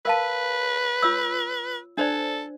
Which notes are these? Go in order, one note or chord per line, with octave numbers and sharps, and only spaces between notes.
A#4 B4 F5 A5
F4 C#5 E6
D4 A4 C5 D5